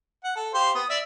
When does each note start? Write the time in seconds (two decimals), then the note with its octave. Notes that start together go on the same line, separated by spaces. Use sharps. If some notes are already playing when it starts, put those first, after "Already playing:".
0.24 F#5
0.36 A4
0.54 G4 C5 F5
0.75 B3 D#6
0.90 D5 E5